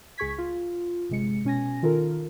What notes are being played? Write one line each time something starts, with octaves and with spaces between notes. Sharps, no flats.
C#2 G#4 C#6 G#6 B6
F4
G1 C3 G#3 C#7
B2 C#4 G#5 A#6
D#3 F4 A4 A#4